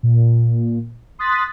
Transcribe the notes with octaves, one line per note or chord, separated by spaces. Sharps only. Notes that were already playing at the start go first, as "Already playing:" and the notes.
A#2
C6 D#6 F#6 A6 B6